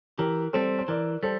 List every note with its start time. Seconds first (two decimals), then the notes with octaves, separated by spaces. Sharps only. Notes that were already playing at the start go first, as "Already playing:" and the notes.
0.18 E3 G4 A#4
0.53 G3 C4 A4 C5
0.79 C5
0.88 E3 A#4 D5
1.23 G3 A4 C5